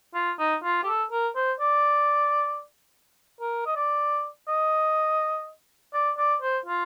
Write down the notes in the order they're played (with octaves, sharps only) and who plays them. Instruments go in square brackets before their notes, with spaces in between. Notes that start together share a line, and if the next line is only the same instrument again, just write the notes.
[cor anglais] F4
D#4
F4
G4
A4
A#4
C5
D5
A#4
D#5
D5
D#5
D5
D5
C5
F4